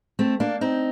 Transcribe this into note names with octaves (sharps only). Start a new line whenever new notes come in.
A3 C4
A#3 D4
C4 D#4